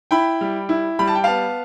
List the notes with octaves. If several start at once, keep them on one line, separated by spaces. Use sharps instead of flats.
E4 G5 B5
G3
E4
G3 B5
A5
G5
B3 F5 A5